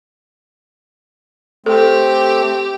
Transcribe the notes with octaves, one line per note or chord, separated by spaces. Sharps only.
A3 C4 G4 A4